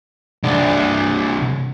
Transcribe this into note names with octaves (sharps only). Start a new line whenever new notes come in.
C2 D4